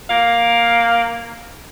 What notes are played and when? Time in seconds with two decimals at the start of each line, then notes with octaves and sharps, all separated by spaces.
0.10 A#3 F5